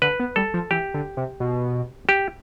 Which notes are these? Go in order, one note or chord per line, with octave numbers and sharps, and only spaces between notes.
D3 B4
B3
G3 A4
F3
E3 G4
D3
C3
B2
G4